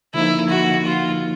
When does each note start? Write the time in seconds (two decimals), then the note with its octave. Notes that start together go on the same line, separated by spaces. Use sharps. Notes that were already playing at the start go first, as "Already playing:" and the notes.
0.14 D3 F3 A#3 D#4 E4
0.50 F#4
0.85 F4